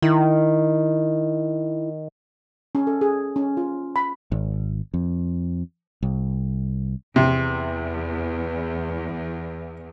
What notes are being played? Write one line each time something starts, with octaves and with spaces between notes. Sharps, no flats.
D#3 E4
C#4
A4
G#4
C#4
F4
B5
G#1
F2
C2
E2 C3